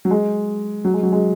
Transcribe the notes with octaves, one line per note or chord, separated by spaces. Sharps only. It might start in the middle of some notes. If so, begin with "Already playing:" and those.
F#3
G#3
F#3
G#3
F#3
G#3